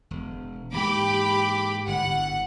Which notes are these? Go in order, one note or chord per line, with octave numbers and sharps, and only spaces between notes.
E1
G#2 E3 A#3 G4 B5 D6
G1 A2 F#5